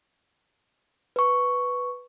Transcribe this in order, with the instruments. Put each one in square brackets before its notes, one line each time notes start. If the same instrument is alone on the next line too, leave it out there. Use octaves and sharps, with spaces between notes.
[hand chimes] B4 C#6